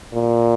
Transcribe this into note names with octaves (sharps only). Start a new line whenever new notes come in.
A#2